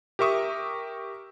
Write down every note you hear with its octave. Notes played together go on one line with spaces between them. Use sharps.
G4 A#4 E5 C#6 D#6